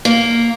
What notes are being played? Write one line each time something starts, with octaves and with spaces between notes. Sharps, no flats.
A#3